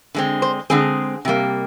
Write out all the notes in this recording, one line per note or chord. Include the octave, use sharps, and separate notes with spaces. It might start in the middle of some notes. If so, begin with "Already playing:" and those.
D3 G#3 C4
C5
D3 G#3 C4 G#4
C3 G3 A#3